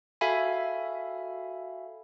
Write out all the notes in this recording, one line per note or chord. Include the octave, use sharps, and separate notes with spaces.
F#4 A4 E5 F5 G#5 B5